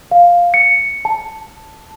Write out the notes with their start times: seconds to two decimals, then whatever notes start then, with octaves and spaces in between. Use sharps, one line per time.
0.11 F5
0.54 C#7
1.05 A5